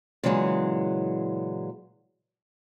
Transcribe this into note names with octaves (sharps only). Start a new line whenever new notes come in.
A#2 C#3 E3 F#3 G#3